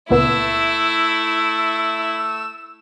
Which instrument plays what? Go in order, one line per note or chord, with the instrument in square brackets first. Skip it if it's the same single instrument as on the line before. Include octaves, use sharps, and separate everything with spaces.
[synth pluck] C#2 A#2 B3 [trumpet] A3 [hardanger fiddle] E4 [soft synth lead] E6